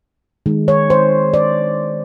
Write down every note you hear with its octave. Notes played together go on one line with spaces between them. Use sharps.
D#3 G#3
C#5
C5
D5